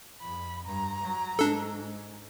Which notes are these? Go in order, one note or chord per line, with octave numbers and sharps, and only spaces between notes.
F2 B5
G2 A#5
F#3
G#2 D4 A4